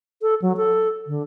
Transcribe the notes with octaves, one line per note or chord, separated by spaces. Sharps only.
A4
F#3
A4
D3